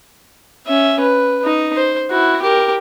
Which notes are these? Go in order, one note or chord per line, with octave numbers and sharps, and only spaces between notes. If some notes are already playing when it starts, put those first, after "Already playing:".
C#4 E5
B4
D#4
C5
E4 F#4
G4 A#4